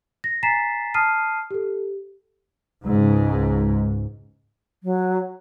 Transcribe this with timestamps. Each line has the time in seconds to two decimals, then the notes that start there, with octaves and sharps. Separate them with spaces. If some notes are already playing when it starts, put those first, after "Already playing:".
0.24 A#6
0.43 G#5 A#5 A6 B6 C7 E7
0.94 A5 D#6 F6 C7 D#7
1.51 G4 A4
2.84 C#2 G#2
4.83 F#3